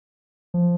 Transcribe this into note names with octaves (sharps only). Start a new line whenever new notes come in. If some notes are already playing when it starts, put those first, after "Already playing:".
F3